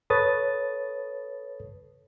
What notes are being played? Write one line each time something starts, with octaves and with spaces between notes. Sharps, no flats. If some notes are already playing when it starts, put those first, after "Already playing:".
A4 B4 C#5 D#6 A6